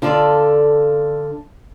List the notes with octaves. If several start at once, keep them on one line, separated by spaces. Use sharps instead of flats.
D3 F4 A4 D5